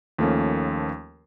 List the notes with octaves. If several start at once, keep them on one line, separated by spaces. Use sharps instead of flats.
D#2 F3 A3 A#3 C#4